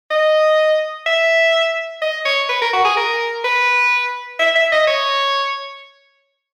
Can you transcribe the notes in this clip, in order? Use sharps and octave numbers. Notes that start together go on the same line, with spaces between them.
D#5
E5
D#5
C#5
B4
A#4
F#4
G#4
A#4
B4
E5
E5
D#5
C#5